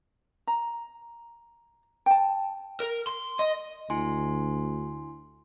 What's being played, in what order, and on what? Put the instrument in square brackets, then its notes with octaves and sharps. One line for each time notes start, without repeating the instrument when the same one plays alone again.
[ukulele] A#5
G5 A5
[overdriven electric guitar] A#4
C6
D#5
[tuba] D2 [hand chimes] E4 G#5 C6